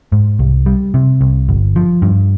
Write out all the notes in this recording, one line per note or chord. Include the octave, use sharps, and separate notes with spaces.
G#2
C2
G3
C3
C2
G1
F3
G2